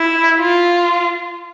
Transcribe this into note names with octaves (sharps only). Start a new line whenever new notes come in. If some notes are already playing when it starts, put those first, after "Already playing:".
Already playing: E4
F4